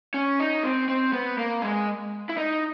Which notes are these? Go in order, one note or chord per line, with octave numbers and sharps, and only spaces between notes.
C#4
D#4
C4
C4
B3
A#3
G#3
E4
D#4